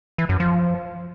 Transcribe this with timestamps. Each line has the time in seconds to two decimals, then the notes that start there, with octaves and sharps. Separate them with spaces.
0.18 E3
0.29 F#2
0.40 F3